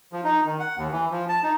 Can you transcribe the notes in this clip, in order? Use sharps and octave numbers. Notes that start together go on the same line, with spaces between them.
F3
D#4
D#3
F#5
D#2
E3
F3
A5
D#4